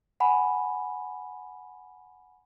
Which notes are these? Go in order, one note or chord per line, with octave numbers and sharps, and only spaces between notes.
F#5 G#5 B5